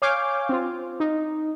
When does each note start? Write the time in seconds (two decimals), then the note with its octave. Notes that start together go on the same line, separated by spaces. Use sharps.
0.02 C#5 F5 G#5 D6 F6 G6
0.49 C4 F4
1.00 D#4